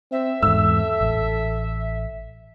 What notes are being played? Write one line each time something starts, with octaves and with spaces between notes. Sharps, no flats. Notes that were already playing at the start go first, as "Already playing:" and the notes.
C4 E5
E2 G#2 A4 E6
A1